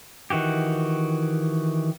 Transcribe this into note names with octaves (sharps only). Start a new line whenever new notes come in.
D#3 E3 F#4 G4